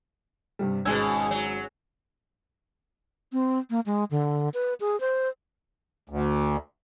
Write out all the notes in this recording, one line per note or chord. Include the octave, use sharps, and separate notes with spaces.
G2 C3 G3
G#1 B2 G#3 C#4 E6 G#6
F#3
C4
A#3
G#3
D3
B4
G#4
C5
D2